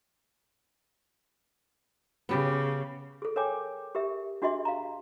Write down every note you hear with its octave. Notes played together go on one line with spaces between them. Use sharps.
C#3 B3 G4
G#4 A4
A#4 C#5 G5 G#5 D6
G4 A#4 E5
D4 F#4 G#4 D#5 E5 C6
F5 A#5